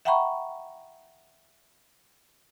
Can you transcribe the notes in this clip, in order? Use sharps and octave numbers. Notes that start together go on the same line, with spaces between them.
E5 F#5 G5 A#5 B5 C#6